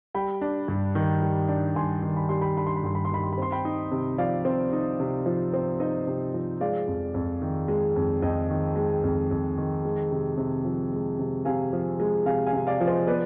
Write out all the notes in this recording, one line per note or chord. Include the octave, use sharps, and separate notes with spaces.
G3 G5 B5
D4
G2
D#3
G3
D4
G2 G#5 C6
D#3
B5
G3 C6
G5 B5
D4 B5
C6
B5
G2 C6
B5
C6
D#3 B5
C6
B5
C4 C6
G5 B5
D#4
C3
F3 D5 F5
C4
D#4
C3
F3
C4
D#4 C5 D#5
C3
F3
G#3 D5 F5
F2
F2
D#3
G#3
F2
F2 D#5 G5
D#3
G#3
F2
F2
D#3
G#3
C3
C3
F3
G#3
C3
C3 F5 G#5
F3
G#3
C3 F5 G#5
F5 G#5
C3
D5 F5
F3
C5 D#5
B3 B4 D5